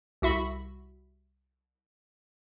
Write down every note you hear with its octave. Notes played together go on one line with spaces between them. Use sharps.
C2 F#4 E5 B5